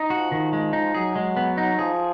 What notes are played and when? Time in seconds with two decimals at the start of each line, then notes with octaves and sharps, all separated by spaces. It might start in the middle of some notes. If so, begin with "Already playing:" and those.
Already playing: D#4
0.10 F3 F#4
0.32 D#3
0.53 G#3
0.73 D#4
0.94 F#3 G#4
1.16 G#3
1.37 B3
1.57 D#4
1.79 F3 G#4